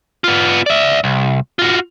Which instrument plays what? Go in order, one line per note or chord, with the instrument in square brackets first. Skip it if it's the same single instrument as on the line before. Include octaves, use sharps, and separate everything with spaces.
[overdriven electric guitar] B3 F4
D5 E5
C2
F4 F#4